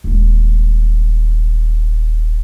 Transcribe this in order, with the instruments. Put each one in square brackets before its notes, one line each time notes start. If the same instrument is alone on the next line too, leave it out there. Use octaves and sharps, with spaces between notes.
[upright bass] D#1 G#3